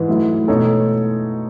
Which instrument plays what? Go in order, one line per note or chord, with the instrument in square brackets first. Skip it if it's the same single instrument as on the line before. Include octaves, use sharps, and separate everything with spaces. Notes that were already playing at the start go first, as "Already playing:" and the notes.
Already playing: [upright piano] G#2 E3
[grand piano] F#3 A3 E4
B2 A3 D#4 A4 C#5